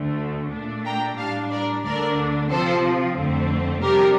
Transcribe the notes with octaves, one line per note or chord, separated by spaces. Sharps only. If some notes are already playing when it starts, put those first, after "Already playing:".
Already playing: D2 D3 A3
A#2 A3 D4
G5 A#5
A2 G3 D4 F5 A5
A#4 D5
D2 D3 A3 D4 A#4 D5
C3 F3 C4 A4 C5
F2 D3 A3 C4
C3 G3 D4 G4 A#4